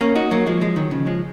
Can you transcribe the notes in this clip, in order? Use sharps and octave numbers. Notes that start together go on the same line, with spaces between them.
A#3 C#4
D#4 F#4
F#3 A#3
F3 G#3
F3 G#3
D#3 F#3
C#3 F3
F3 G#3